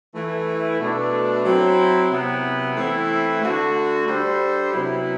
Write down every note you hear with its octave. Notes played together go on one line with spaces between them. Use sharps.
E3 A3 E4
B2 A3 D4
F#3 C4 E4
C3 F#3 B3 E4
E3 A3 C4 E4
D3 A3 D4 F#4
G3 D4 A4 C5
C3 F#3 B3 E4